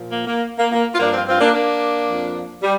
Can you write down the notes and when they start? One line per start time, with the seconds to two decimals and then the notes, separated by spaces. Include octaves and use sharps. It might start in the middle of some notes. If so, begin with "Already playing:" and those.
Already playing: A#2 F3
0.09 A#3
0.27 A#3
0.59 A#3
0.72 A#3
0.95 F4
0.99 G2 F3 A#3 D4
1.13 C4 F4
1.27 C4 F4
1.40 A#3 D4
1.54 A#3 D4
2.08 F2 F3
2.63 G3